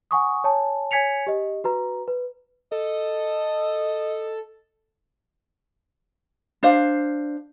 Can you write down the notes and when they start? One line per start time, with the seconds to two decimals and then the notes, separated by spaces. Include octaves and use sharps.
0.11 F#5 G#5 C#6 D#6
0.44 C#5 G#5 A5
0.91 C#5 G#5 G#6 B6 C#7 F7
1.27 G4 D#5
1.64 F#4 B4 A#5
2.08 B4
2.72 A4 D#5
6.63 D4 C5 F5